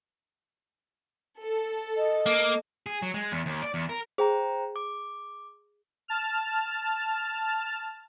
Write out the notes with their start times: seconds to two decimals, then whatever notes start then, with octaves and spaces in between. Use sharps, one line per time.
1.40 A4
1.97 D#5
2.26 A#3
2.86 G#4
3.02 F#3
3.14 G#3
3.32 E2
3.46 D#2
3.62 D5
3.74 E2
3.89 A#4
4.18 G#4 C5 G5 A#5
4.76 D6
6.08 A5 F6